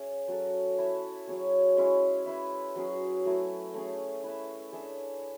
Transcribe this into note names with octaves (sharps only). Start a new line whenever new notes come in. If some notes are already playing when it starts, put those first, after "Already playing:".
Already playing: C#4 G#4 C#5 E5
F#3 C#4 F#4 A4
E4 A4 C#5 E5
F#3 C#4 G#4 C#5
G#3 C#4 E4 G#4
E4 B4 E5
F#3 C#4 G#4
F#3 A3 E4
A3 C#4 G#4
E4 B4 E5
D4 G#4 C#5 E5